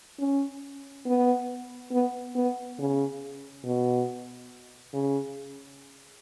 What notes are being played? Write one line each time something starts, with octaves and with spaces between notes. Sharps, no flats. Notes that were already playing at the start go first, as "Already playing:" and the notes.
C#4
B3
B3
B3
C#3
B2
C#3